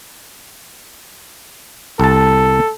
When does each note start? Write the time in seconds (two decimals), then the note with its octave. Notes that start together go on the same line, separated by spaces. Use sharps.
2.00 C2 A4 A5